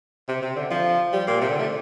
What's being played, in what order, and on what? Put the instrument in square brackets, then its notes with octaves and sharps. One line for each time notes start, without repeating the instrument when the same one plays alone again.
[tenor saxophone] C3
C3
D3
F3
G3
A#2
C3
D3
A3